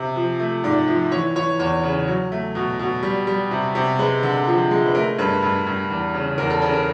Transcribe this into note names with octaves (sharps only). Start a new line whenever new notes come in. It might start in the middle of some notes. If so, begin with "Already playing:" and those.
Already playing: C3
F3
A3
G#2 D5
F3
E3 C#5
E3 C#5
E2 C#5
C#3
F#3
A3
B2
B2
G3
G3
C3
C3
G#3 B4
D3
F3
G#3
B4
A3 A#4
G2 B4
G2
G2
E2
C#3
E2 A#4
A4
C#3 A#4
A#4